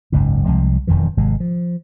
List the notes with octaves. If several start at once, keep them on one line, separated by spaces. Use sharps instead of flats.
F#1 C#2 G#2
C2 C3 F3 G#3
E1 F2 D#3 E3
G#1 C3 G#3
F3